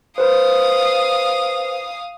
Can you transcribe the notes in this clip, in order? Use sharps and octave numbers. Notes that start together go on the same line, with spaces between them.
B4 C5 F5 D#6